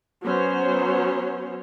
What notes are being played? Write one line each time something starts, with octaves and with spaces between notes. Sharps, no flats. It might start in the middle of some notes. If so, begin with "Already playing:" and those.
F#3 B3 C#4 C5 C#5